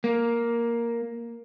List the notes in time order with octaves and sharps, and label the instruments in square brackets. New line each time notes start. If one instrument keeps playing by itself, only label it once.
[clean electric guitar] A#3